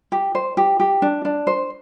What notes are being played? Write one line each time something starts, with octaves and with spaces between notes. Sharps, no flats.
G4
C5
G4
G4
D4
D4
C5